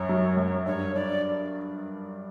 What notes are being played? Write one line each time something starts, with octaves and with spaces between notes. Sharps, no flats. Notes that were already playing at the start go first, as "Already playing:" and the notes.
Already playing: F#2 C#5
F#3
F#2
G2 C#5
D4 D5